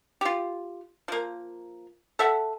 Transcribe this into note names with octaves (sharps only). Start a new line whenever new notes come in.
F4 G4
F3 A#3
A4 E5 F#5